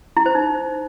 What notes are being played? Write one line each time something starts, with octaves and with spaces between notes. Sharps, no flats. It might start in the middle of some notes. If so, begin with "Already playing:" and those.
E4
C5
D#4